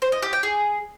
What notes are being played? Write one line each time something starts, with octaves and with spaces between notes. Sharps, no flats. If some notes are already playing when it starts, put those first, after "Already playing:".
C5
D#5
G4
G5
G#4